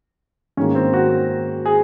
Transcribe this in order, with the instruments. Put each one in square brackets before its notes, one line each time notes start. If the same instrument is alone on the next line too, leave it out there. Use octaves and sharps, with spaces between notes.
[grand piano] G#2 D#3 A#3 C#4
C4
F#4
G#4